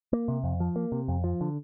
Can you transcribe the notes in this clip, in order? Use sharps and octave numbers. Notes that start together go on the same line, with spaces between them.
A#3
C3
F2
F3
A#3
C3
F2
F3
D3